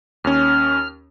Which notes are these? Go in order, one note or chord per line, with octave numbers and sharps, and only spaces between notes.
D#2 C#4 F6